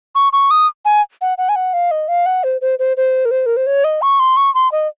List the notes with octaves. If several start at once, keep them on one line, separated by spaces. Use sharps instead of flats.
C#6
C#6
D#6
G#5
F#5
F#5
G#5
F#5
F5
D#5
F5
F#5
C5
C5
C5
C5
A#4
C5
A#4
C5
C#5
D#5
C#6
C6
C#6
C6
D#5